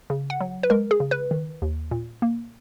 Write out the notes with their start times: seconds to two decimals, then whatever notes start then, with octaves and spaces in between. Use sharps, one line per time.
0.10 C#3
0.30 F#5
0.41 F#3
0.63 B4
0.70 G#3 A#4
0.91 G#4
1.00 C#3
1.11 B4
1.31 D#3
1.62 D#2
1.91 A#2
2.22 A#3